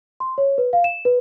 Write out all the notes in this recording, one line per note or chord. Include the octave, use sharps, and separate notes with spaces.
C6
C#5
B4
F5
E7
B4